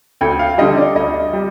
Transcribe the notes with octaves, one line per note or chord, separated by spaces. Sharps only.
D2 G5
F5
D3 G3 D#5
D5
D2 D#5
G3